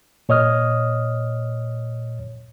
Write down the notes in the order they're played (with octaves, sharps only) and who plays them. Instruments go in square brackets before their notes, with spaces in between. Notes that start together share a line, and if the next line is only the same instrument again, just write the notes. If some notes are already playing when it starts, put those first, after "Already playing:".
[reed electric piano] A#2 C#5 D#5 D#6 F6